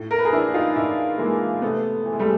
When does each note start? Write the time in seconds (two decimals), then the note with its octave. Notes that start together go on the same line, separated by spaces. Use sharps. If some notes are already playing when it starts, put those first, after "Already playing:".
Already playing: A2
0.11 A#4
0.18 B4
0.25 G#4 A#4
0.32 E3 D4 E4
0.54 D#4 F4
0.76 A2 D4 E4
1.18 E3 G#3 A#3
1.62 C3 A3 B3
2.05 E3
2.13 G#3
2.19 G3 A3